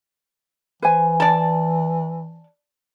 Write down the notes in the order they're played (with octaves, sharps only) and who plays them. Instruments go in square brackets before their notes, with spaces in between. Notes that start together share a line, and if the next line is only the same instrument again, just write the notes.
[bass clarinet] E3 [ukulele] B4 C5 G#5
[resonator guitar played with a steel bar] D5 A5